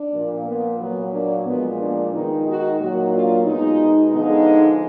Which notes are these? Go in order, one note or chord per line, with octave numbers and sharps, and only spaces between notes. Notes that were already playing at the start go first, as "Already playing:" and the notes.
Already playing: D4
A#2 F3 A#3
B3
A#2 F#3 A#3 B3
A#3 D4
A#2 F3 G#3 B3
A#3 D4
D#3 G#3 B3 D#4
D#4 F#4
A#2 F#3 A#3 D#4 F#4
D4 F4
B2 G#3 B3 D#4
D3 F3 G#3 B3 D#4